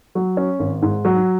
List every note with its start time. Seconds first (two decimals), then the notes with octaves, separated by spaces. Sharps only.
0.15 F#3
0.37 C#4
0.59 G#1
0.82 G#2
1.05 F#3